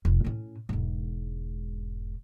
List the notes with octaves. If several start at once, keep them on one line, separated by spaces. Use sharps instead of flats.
F1
A2 C#4
E1 G#2